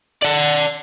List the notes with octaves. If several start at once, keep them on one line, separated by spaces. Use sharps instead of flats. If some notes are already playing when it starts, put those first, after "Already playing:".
D5 F#5